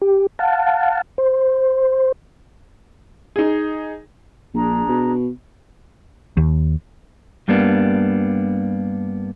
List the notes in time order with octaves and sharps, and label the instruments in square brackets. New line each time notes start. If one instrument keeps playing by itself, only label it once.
[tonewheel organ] G4
F5 F#5 A5
C5
[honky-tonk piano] D#4 G#4
[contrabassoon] A#1 [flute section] D4 G#4 A#5
[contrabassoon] B2
[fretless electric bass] D#2
[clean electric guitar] G2 G3 A#3 B3 D4